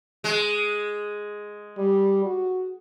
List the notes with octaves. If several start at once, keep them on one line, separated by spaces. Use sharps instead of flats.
G#3
G3
F#4